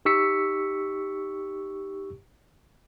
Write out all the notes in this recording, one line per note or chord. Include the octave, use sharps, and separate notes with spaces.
D#4 G4 C#6 E6 B6 C#7